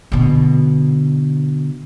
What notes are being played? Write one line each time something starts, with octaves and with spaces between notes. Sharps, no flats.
B2 D3